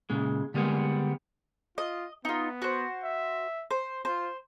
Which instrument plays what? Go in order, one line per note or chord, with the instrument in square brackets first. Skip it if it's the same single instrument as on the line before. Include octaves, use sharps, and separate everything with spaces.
[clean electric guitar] A#2 C#3 G#3
D3 G3 G#3 A#3 B3
[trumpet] F4 [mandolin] D#5
[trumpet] B3 [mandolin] D#4 F4
[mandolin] F#4 C5
[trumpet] E5
[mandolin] C5
[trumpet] F4 [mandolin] C5